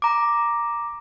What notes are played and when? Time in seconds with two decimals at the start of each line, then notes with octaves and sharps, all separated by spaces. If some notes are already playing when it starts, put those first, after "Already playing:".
0.02 A#5 D6